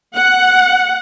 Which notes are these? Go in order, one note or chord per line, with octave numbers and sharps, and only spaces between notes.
F#5